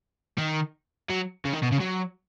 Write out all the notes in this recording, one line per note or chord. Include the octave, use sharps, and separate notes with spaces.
D#3
F#3
C#3
D#3
B2
C#3
F#3